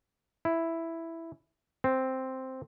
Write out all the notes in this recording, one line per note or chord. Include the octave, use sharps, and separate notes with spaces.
E4
C4